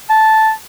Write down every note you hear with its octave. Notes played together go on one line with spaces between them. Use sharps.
A5